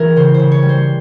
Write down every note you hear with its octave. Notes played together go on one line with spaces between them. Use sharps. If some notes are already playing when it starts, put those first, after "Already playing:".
Already playing: E3 F#4 G#4 A#4
C#3 C5
C#3 C5
C#5
G3
C5